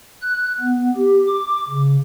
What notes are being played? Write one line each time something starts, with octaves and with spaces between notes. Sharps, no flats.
F#6
B3
G4
D6
C#3